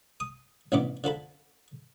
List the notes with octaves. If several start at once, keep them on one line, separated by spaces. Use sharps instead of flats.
D#6
A1 G2 C3 B3 D6
D3 F3 A4 B5